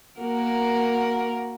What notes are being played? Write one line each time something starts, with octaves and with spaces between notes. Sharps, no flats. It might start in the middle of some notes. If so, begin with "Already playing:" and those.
A#3 F#4 A#4